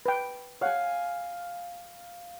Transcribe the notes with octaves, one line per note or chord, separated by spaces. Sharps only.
B4 G5
C#5 F5 F#5 G#5